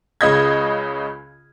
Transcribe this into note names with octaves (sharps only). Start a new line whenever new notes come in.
C#2 C#3 D#5 G#6